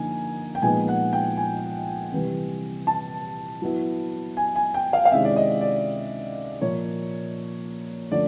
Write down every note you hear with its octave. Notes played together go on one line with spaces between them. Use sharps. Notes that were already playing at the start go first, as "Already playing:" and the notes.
Already playing: D3 F3 A#3 D#4 G#5
G5
A#2 F3 G#3 B3 D#4 G#5
F#5
G5
G#5
C3 E3 G3
A5
F#3 B3 E4
G#5
G#5
G5
F5
F5
C3 D#3 G#3 C#4 E4 E5
D5
D#5
D5
A#2 F3 A#3 C#5
D3 F3 A3 C#4 D5